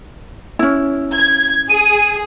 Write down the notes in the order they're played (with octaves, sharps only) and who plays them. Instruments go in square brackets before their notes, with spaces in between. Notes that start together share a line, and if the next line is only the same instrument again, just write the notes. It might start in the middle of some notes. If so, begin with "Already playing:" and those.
[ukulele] C#4 E4
[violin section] G#6
[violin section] G#4 [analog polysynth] D#7